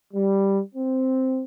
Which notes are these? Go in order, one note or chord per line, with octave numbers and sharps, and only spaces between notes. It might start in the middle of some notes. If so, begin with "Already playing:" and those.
G3
C4